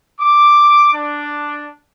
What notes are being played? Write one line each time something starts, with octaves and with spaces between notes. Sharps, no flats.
D6
D4